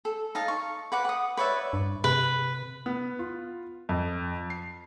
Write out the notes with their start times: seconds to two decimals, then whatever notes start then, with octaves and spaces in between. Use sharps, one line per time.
0.05 A4
0.35 D#4 F5 A5
0.48 C#6
0.92 B4 F#5 D6
1.04 F#5 D#6
1.37 B4 C#5 D5 E5
1.73 G2
2.04 C3 B4
2.86 B3
3.19 F4
3.89 F2
4.50 C7